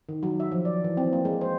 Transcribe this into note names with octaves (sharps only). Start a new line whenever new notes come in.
D#3
F#3
E5
F3
D5
E3
C4
A#3
G#3
C5